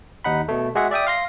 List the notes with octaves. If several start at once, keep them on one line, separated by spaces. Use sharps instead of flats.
D#2 D#4 F#5 B5
B2 A3
G#3 F#4 G#4 E5 F#5
D5 E5 G5 D#6
F5 C6 A#6